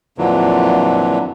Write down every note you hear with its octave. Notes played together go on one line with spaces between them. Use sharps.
F2 A#2 D3 E3 F#3